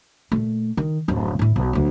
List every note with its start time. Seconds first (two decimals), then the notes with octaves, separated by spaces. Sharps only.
0.32 A#2 A3
0.77 D#3
1.08 D1 F#2
1.39 A2 E4
1.56 B1
1.73 D2 F#3